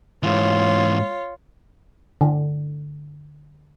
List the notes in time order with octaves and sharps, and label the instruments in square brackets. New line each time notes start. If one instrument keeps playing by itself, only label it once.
[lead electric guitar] G#2 E3 [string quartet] F4 C#5
[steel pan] D3